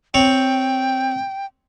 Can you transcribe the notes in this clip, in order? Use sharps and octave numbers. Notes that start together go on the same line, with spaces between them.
C4 C#5 G5